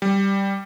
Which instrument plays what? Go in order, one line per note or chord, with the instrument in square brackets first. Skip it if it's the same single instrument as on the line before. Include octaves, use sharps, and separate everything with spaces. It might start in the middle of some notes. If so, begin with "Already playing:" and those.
[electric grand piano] G3